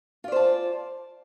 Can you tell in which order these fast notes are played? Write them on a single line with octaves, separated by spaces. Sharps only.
F4 D5 C5 A5